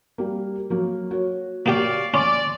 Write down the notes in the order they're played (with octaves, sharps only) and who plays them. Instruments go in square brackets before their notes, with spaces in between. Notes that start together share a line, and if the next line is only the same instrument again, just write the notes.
[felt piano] G3 A#3
F#3 A#3
F#4 C#5
[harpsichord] A#3 G4 G5 [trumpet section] D5 F5 C#6
[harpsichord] C#4 [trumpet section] D5 [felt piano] C6